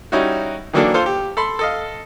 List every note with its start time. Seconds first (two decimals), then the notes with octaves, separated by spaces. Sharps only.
0.12 G3 C#4 D#4 E4 F#4
0.73 D#3 E3 F#3 A#3 D4 A4
0.94 F4 A4 C5
1.06 G4
1.37 A4 B5 C6
1.59 A4 D#5 F5